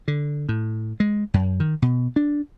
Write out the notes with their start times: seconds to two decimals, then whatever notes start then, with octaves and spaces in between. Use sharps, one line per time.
0.08 D3
0.49 A2
1.00 G#3
1.34 F#2
1.60 D#3
1.82 B2
2.16 D4